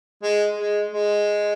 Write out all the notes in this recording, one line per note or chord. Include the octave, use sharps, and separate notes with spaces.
G#3
G#3
G#3